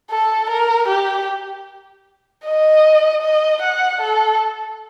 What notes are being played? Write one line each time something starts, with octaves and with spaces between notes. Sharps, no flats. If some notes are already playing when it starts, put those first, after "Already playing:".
A4
A#4
G4
D#5
D#5
F#5
A4